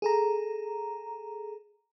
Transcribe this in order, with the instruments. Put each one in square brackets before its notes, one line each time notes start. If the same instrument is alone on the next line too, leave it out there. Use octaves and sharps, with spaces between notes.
[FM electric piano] G#4 A4 A#5